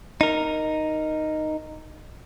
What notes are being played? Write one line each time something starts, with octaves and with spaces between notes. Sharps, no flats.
D#4 A#4